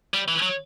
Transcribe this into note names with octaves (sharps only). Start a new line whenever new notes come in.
G3
E3
F#3